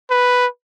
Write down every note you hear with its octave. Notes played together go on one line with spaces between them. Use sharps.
B4